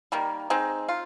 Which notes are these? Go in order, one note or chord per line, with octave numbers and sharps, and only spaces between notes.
D#3 G3 A#3
G#3 C4 D#4
F4